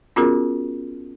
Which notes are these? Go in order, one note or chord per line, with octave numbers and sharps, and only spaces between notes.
B3 C#4 F4 F#4 G#4 A#4